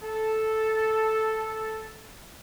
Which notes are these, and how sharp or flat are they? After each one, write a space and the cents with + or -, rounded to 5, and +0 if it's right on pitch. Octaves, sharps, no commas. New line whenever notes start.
A4 -5 A5 +0